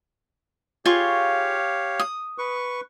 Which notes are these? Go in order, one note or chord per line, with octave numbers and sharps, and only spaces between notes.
F4 G4 G#4 C#5 F5 C#6
D#6
B4 C#6